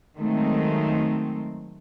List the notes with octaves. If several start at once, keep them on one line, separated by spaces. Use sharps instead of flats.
D#3 F#3 G#3 A3 C4